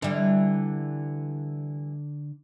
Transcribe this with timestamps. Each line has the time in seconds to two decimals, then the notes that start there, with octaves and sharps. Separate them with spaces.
0.02 D3 E3 G3